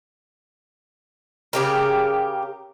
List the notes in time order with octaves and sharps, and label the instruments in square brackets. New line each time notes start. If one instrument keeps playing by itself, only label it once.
[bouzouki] C#3 G4 A#4